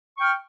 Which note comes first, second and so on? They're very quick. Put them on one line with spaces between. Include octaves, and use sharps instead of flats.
C#6 G5 F6